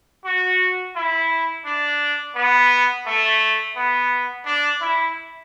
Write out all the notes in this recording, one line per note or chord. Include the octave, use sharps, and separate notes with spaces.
F#4
E4
D4
B3
A3
B3
D4
E4